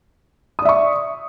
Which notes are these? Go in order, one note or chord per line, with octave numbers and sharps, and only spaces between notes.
D5 E5 C#6 D#6